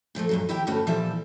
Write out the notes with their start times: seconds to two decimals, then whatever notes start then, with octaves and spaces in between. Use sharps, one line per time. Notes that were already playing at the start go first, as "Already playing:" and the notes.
0.15 A#2 F3 G#3 A3
0.29 G2 A#2 F#3
0.49 D#2 E4 G4 E5 G5
0.67 D2 G2 A3 C#4 F#4
0.87 A#2 E3 F3 G3 A4 E5